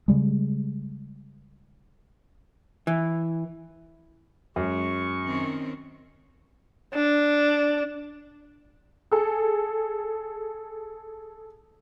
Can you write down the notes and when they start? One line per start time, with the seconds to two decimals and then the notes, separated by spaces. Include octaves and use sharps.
0.08 C#3 G3 G#3
2.87 E3
4.56 F#2 G#3 C#6
5.25 D#3 C4 C#4
6.94 D4
9.12 G#4 A4